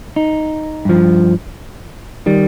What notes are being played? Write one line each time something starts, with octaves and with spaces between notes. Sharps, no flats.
D#4
G2 F3
D#3 G3